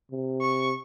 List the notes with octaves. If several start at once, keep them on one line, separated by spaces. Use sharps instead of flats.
C3
C#6